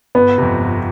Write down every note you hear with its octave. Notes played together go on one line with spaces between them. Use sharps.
G1 B3
F2 C3
G1